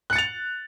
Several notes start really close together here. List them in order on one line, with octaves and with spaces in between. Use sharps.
F#6 C#7 A6 F7